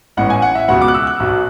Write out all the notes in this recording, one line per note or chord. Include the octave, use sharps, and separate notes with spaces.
A1 A2 E3 F#5
G#5
F#5
E5
C#2 B2 F#5
D6
F#6
E6
F#6
B1 B2